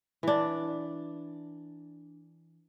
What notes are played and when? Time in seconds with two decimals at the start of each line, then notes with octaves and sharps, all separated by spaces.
0.23 E3 D4